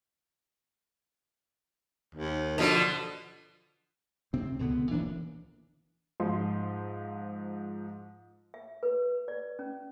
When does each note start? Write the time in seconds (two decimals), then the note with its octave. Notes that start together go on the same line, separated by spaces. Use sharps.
2.15 D#2
2.58 B2 D3 F3
4.33 D2 C3 C4
4.59 C#2 B2 D3 B3
4.91 D#1 E3 A#3 D4
6.20 G#2 F3 C6
8.54 E5
8.83 B4
9.28 D5
9.59 C#4